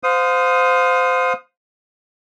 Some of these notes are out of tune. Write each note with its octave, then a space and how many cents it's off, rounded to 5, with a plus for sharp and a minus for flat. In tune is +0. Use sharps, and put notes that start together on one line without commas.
C5 -20 F5 +30 D#6 +0